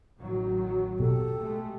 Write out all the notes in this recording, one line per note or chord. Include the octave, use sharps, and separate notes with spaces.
A1 D#3 F#3
B2 G4 A4
G#3 A3